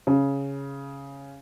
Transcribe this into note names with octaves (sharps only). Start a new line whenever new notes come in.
C#3